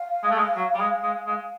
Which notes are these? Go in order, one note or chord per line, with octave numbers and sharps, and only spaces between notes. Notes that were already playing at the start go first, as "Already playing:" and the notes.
Already playing: F5
G#3
A3
G#3
F#3
G3
G#3
G#3
G#3